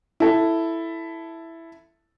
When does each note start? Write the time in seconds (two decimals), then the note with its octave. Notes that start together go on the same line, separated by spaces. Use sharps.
0.20 E4 A4